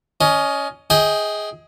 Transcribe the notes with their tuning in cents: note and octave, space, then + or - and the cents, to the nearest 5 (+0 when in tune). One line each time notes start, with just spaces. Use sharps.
C#4 +20 D#5 -5
G#4 +0 D#5 +30 G5 +0